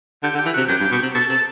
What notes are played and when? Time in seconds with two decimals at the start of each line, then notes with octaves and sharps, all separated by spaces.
0.23 D3 G4
0.35 D3
0.39 G4
0.46 E3
0.54 C3 F#4
0.68 F#2 G4
0.80 G2
0.92 B2
1.03 C3
1.14 B2 A4
1.29 C3 A4